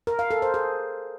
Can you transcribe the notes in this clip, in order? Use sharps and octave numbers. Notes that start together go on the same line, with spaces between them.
A#4
F5
A4
C5
G#4